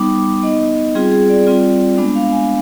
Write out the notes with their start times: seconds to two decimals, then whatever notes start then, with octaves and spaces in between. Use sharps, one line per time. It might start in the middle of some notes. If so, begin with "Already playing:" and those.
Already playing: G3 B3 D#4 D6
0.43 B3 D#4 D#5
0.95 G3 C4 F4 G#4
1.12 G#4
1.29 D5
1.47 G3 C4 F4
1.98 G#3 B3 D4
2.15 F5
2.32 G#5